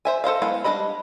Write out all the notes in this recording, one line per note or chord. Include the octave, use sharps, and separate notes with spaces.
C5 E5 G#5
A4 C5 D#5 F5
G#3 B3 E4 F5
G3 D4 A4 D#5 B5